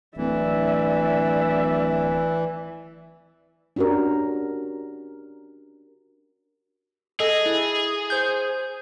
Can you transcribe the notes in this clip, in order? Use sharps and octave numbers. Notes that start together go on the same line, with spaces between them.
D1 E3 D5 E5
C#4 D4 F#4 G4 A#4
G#4 A4 D#5
E4
C5 G6